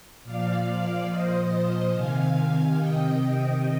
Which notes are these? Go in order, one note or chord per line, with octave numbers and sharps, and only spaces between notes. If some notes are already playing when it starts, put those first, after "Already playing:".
A#2 F3 D5 F5
A#2 F3 C5 D#5
C3 D#3 F5 G#5
C3 D#3 D#5 G5